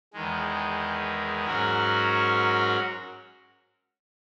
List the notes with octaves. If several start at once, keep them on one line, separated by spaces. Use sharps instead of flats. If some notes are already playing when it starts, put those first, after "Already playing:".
E2 D#3 G#3
G#2 F#3 C#4 F#4 A#4